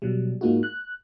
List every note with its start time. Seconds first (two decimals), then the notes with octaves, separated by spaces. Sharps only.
0.02 B2 F#3 G3
0.41 G#2 G#3 A#3 D#4 F4 F#4
0.63 F#6